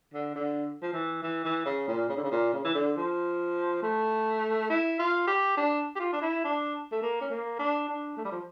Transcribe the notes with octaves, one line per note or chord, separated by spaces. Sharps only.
D3
D3
F3
E3
E3
E3
C#3
A#2
C#3
D3
C#3
A#2
C#3
E3
D3
F3
A3
E4
F4
G4
D4
G4
F4
D4
E4
D4
A3
A#3
C#4
A#3
D4
D4
A3
G3
F3